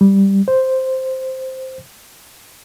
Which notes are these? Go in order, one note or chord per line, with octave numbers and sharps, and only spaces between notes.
G3
C5